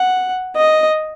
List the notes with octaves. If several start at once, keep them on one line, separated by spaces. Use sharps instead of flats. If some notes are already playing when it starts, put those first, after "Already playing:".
Already playing: F#5
D#5